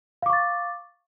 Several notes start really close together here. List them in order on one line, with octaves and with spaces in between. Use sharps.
F5 D6 C#6 A6